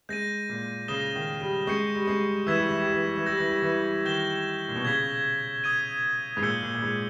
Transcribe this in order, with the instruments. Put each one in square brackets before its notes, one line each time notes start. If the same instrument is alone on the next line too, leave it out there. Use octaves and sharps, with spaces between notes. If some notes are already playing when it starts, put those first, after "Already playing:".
[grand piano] G#3 [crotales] G6 A#6 D#7
[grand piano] A#2
[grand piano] C#3 [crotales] D#6 A#6 E7 G7
[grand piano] D#3
G3
[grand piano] G#3 [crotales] C#6 G6 C#7
[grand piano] G3
G#3
[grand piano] E3 [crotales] E6 G#6 B6 E7
[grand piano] G3
E3
G3
E3
G3
E3
[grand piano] G3 [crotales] E6 G6 A#6
[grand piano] E3
G3
E3
[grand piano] D#3 [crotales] G6 A#6 E7 G7
[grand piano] A#2
B2
[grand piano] C#3 [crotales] G#6 B6 G7
[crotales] D#6 G#6 D#7
[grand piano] G#2
[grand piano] A#2 [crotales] E6 G6 C#7 G7
[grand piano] A#2
A#2
G#2